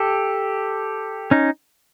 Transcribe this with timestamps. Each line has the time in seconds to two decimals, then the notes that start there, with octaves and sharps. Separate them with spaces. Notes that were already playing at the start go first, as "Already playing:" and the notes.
Already playing: G4 A4
1.31 C#4 D#4